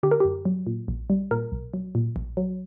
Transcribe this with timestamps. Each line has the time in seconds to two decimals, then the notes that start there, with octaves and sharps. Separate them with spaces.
0.03 D3 G4
0.11 A#4
0.20 F#2 G4
0.45 F#3
0.67 A#2
0.88 A#1
1.10 G3
1.31 A#2 A#4
1.52 B1
1.74 F#3
1.95 A#2
2.16 A#1
2.37 F#3